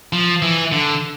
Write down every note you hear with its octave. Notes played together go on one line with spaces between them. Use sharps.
F3
E3
D3